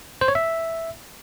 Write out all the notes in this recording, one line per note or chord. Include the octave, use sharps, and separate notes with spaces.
C5
C#5
E5